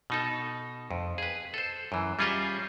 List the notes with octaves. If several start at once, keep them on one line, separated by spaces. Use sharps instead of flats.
B2 D#4 A4
F2
G#4 B4
A4 C5
F#2 E3
G3 C#4 F4 G#4 D#5 E5